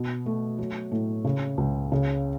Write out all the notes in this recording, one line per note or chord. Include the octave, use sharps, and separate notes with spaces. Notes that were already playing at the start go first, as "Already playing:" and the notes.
Already playing: B2
A3
F#3
A2
C#3
C#2
C#3